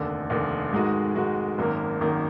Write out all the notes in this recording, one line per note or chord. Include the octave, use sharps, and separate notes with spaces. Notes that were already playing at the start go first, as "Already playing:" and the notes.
Already playing: F1 D#2 D3
F1 D#2 D3
G#2 D#3 G#3 D#4 F#4
G#2 D#3 G#3 D#4 F#4
G#1 F#2 D#3 A#3
G#1 F#2 D#3 A#3